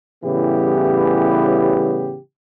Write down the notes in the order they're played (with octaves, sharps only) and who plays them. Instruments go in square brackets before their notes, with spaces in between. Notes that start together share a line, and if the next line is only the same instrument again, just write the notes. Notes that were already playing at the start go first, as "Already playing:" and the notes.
[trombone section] A2 C#3 E3 G3 B3 G4